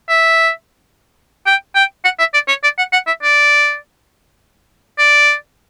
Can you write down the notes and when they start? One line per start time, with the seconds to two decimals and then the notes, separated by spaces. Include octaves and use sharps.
0.09 E5
1.46 G5
1.75 G5
2.05 F#5
2.19 E5
2.34 D5
2.48 C#5
2.64 D5
2.78 F#5
2.93 F#5
3.07 E5
3.23 D5
4.98 D5